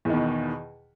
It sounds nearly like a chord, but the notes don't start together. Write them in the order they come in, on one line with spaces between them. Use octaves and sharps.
E2 D#3 B2